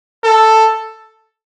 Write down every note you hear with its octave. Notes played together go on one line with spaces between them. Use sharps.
A4